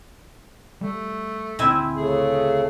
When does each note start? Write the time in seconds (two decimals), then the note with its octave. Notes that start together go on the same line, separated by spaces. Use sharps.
0.81 G3 A3
1.59 D2 A#2 C4 E4 G#5
1.96 C#3 A3 G#4